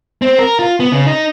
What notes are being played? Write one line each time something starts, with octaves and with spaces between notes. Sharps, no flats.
C4
A#4
F4
B3
C#3
D#4